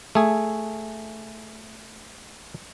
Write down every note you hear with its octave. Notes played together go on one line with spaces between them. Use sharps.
A3 G#4